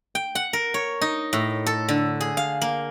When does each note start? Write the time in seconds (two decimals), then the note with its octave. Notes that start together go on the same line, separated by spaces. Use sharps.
0.15 G5
0.35 F#5
0.53 A#4
0.74 C#5
1.01 D#4
1.33 A2
1.66 A4
1.89 D3
2.21 G#4
2.37 F5
2.62 A#3